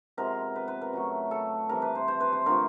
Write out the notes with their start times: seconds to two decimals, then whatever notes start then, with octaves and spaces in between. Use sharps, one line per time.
0.17 C3 F3 G#3 B3 A#4
0.56 B4
0.68 B4
0.81 A#4
0.93 C#3 F#3 A3
1.31 A4
1.69 C3 E3 G3 A#4
1.82 B4
1.95 C5
2.08 C5
2.20 B4
2.33 C5
2.46 D3 F3 A3 A#4